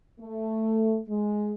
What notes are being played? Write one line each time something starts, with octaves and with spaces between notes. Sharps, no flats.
A3
G#3